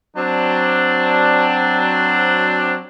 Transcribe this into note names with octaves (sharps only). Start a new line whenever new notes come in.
F#3 C4 D4